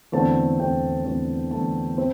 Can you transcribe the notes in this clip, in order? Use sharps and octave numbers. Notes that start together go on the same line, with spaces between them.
E2 D3 A3 C4 A5
E2 D3 A3 C4 G5
E2 D3 A3 C4
E2 D3 A3 C4 A5
C4